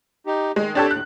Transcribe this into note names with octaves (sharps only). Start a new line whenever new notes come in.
D#4 G4
D#3 G#3
C4 D4 G4 A4 C#5 A5
D#2 A2 F#6